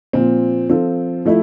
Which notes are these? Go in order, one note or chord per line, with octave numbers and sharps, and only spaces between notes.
A#2 F3 C4
F3 C4 F4 A4
F3 A3 E4